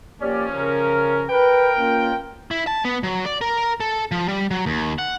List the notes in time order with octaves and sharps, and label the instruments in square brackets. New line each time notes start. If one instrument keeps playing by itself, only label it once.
[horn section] F3 C#4 [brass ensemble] A#3 G4 D5
[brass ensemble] C#3 A#4
[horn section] A#4 G5 [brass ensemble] B4
[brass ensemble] A#3 C#4 F4
[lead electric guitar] E4
A5
B3
F#3
D5
A#4
A4
F3
G3
F#3
D#2
F#5